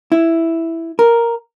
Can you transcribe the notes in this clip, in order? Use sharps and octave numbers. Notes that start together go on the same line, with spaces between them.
E4
A#4